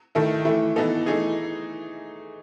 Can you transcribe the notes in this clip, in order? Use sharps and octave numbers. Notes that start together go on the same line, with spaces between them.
D#3 A3 E4 A4
E3 A3 E4
E3 B3 D#4 A4
E3 A3 D#4 G#4